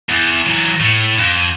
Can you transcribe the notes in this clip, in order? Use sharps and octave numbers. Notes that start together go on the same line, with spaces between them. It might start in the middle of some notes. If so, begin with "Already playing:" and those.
E2
E3 F#3
A2
F2